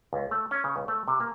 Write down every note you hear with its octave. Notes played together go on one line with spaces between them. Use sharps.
C#2
A3
C#4
C#3
C#2
A3
C3
A#3